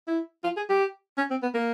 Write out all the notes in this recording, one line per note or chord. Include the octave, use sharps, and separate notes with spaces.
E4
F4
G#4
G4
C#4
C4
B3
A#3